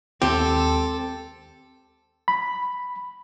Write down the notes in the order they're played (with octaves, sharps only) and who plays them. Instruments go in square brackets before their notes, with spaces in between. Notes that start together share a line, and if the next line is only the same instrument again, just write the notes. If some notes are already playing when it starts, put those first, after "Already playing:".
[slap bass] D#2 G#3 [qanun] C4 [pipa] G4 [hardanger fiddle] A4
[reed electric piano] B5